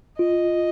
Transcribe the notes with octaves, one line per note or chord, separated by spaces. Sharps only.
F4 D#5